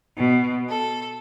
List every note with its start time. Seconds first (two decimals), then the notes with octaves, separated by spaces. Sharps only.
0.17 B2
0.68 A4